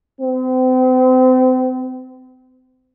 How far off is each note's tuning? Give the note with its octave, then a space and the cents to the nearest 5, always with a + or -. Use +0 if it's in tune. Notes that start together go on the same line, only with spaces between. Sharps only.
C4 -35